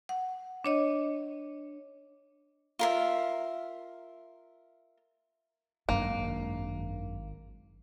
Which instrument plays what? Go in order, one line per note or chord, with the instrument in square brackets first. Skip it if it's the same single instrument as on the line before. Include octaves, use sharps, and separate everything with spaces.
[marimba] F#5
D4 C#5 D#5
[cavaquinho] F4 A#4 E5
[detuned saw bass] G#1 [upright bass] F#2 D4 [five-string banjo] A#3